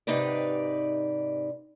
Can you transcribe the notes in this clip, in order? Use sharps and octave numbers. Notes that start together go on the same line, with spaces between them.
G#2 C3 D#4 G4 B4 D5